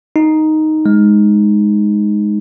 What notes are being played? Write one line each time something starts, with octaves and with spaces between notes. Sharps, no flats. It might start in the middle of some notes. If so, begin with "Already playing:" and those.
D#4
G#3